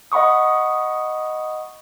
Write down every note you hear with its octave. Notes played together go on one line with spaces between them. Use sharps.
D#5 F#5 B5 C#6 D#6